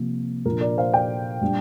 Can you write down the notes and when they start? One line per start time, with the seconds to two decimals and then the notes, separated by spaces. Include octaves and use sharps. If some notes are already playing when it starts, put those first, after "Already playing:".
Already playing: C3 F3 A#3
0.45 A#2 F3 D4 A#4
0.61 A#4 D5
0.77 C5 F5
0.93 D5 G5
1.41 A#2 G3 D4